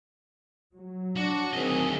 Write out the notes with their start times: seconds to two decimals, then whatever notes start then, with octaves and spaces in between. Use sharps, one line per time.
0.73 F#3
1.16 D4 F#4
1.53 D2 D#3 C4 G#4 D#5